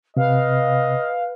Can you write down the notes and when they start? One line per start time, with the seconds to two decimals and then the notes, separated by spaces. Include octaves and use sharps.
0.17 C3 B4 D#5 F5